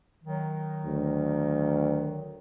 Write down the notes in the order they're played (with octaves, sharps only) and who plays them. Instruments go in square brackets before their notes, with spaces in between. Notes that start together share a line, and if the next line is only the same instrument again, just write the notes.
[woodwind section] D#3 F#3
[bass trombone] D2